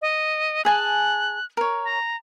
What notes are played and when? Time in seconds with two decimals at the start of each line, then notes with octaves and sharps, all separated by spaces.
0.02 D#5
0.65 G#4 G#5 A5 F#6
1.57 A#4 C#5
1.84 A#5